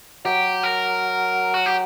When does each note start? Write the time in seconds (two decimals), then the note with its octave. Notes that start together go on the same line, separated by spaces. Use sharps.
0.25 F#3 G4
0.63 A#4
1.54 F#4
1.66 G4